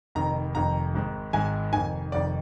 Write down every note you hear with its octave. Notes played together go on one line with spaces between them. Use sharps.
F1 F2 D#3 A#5
F1 F2 D#3 A#5
G#1 G#2 D#3
G#1 G#2 D#3 G#5
F1 F2 D#3 G#5
F1 F2 D#3 D5